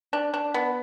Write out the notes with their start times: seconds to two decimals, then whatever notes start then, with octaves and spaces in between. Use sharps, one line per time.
0.13 D4
0.34 D4
0.54 B3